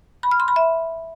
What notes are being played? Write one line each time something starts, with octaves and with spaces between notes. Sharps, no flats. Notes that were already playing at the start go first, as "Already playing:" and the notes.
B5
F6
C6
B5
E5